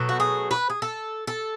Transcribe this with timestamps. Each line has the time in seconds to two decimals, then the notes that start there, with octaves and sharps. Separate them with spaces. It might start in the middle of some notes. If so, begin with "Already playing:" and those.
Already playing: B2 F#3 A3
0.09 F#4
0.20 G#4
0.51 B4
0.70 G#4
0.82 A4
1.27 A4